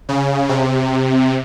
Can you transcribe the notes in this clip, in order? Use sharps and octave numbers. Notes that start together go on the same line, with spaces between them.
C#3
C3